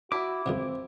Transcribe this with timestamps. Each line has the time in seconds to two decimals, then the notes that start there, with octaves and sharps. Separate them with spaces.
0.12 E4 F#4 D6
0.46 C#2 F#2 B2 C4